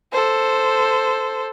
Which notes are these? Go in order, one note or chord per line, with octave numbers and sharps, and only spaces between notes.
A4 C5